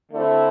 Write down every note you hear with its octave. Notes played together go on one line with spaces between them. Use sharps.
D3 A3 C4 E4